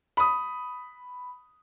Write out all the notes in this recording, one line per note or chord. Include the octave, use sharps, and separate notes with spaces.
B5 D#6